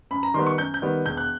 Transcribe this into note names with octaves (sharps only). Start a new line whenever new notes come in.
F#2 B5
A#5
D#3 G3 B3 C6
C#6
F#2 G6
G6
D#3 G3 B3
E1 G6
F#6